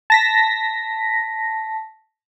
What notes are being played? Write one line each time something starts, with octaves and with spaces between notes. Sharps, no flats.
A5 A#6 B6